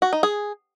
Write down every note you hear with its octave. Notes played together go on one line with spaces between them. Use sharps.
F#4
D#4
G#4